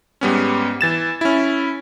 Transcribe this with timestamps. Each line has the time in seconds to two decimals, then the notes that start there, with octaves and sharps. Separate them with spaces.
0.21 G#2 G3 B3 C#4
0.81 E3 A6 E7
1.21 C#4 E4